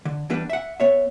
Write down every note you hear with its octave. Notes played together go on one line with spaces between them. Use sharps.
D3
E3 G3 B3 D4 B4
E5 F#5
B3 C#5 E5